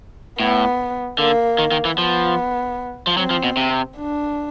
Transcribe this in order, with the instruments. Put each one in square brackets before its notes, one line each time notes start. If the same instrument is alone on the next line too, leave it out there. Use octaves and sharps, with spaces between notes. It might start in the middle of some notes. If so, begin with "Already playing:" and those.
[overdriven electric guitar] A2 [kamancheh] B3
[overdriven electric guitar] D3 [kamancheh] A#3
[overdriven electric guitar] D#3
D#3
E3
[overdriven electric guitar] F3 [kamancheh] B3
[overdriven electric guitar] F3
[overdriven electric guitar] F#3 [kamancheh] C4
[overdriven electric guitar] F3
B2
C3
[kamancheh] D4